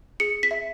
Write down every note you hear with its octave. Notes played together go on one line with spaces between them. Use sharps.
G#4 C#7
B6
E5